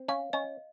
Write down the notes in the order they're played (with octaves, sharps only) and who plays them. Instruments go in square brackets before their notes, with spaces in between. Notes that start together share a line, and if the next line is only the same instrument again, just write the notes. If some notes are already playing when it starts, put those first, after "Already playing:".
Already playing: [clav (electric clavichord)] C4
[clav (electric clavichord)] C#4 [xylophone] F5
[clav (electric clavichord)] C#4 [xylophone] D#5